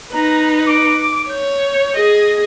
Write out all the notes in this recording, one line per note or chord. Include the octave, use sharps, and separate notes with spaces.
D#4 B4 A#5
D6
C#5 G6
G#4 D#5